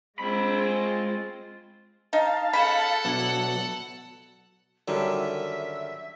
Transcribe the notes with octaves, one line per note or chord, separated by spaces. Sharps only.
G#3 C4 F4 B5
D#4 F5 A5
C#3 A4 F#5 B5
B2 F#3 D4 E4
F#2 D3 D#3 F#3 G3 E5